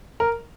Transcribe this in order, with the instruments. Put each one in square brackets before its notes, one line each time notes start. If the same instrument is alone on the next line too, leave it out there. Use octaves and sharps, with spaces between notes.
[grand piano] A#4